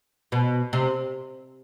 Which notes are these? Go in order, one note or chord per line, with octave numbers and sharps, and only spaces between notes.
B2
C3